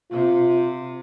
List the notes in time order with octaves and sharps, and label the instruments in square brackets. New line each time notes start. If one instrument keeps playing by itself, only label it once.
[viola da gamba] C3 [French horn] F4